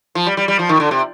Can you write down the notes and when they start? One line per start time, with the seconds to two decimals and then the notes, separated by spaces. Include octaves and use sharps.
0.15 F3
0.27 G3
0.37 G3
0.48 G3
0.59 F3
0.69 D#3
0.80 D3
0.91 C3